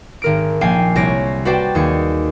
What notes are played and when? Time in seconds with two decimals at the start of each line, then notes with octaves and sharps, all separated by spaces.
0.22 G#1 A#4 D7
0.61 A#1 A#3 G5 G#5 C7
0.96 C2 C#5 A#6 D7
1.45 F#4 B4 C5 D5 G5 A5
1.75 D#2 G#4 C#7